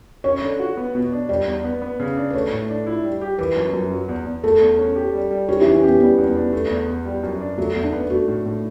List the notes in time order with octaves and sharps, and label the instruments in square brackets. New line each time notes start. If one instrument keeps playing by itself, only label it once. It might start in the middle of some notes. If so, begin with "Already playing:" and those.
[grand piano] C#4 [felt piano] C#5
[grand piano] D3
F#4
B3
B2
D4
[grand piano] G3 [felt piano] D5
[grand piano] E2
B3
B3
C#3
D4
[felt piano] B4
[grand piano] A3 [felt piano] C#5
[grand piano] A2
D4
E4
G3
G4
[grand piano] E3 [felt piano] B4
[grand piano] F#2
F#2
F#3
E2
E2
[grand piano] A3 [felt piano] A4
[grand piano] E2
C#4
G4
G3
G3
[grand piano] C#4 [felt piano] G4
[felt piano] E4
[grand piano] E3
[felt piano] C#4
[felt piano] B3 [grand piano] G4
[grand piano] G3 [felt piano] B3
[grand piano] E2
[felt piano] B3
[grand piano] D4
A3
E2
E2
G3
F#2
D4
[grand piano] F#3 [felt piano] A3
[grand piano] E2
[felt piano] D4
[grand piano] B3
[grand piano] A3 [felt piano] F#4
[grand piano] A2
A2